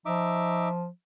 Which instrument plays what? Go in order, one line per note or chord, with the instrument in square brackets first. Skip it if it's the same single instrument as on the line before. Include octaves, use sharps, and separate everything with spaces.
[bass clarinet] F3 [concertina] D#4 E5 D6